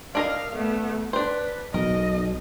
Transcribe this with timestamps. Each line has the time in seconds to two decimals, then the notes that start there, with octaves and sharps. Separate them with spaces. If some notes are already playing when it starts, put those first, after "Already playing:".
0.15 D4 A#4 D#5 F5
0.54 A3 B3
1.13 D4 B4 C5
1.74 B1 A#4 D#5